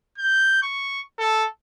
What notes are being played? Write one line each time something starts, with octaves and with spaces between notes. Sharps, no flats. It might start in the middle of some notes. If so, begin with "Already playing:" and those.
G6
C#6
A4